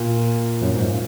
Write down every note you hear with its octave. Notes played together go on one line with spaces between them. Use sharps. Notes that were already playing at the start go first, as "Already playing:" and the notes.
Already playing: A#2
F#2
G#2
A#2